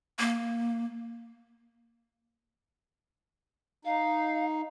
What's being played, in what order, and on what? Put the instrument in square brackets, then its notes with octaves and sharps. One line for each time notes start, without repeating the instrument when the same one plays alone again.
[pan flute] A#3
[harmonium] D#4 [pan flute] F5